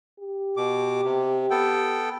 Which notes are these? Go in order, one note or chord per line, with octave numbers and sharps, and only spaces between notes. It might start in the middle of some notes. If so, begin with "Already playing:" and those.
G4
B2 D6
C3
B3 A4 G5